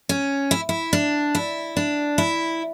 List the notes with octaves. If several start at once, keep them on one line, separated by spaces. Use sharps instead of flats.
C#4
E4
E4
D4
E4
D4
E4